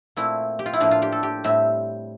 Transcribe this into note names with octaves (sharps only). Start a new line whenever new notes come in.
A#2 A3 C4 E4
G4
F4
E4
A2 F3 A#3 D4
F4
G4
A4
G4
A2 G3 C4 E5